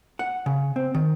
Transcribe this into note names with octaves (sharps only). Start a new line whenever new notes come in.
F#5
C#3
C4
D#3